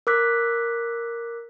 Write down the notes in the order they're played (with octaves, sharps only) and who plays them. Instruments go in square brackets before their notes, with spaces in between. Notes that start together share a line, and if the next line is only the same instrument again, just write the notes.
[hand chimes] A#4 D6 F#6 B6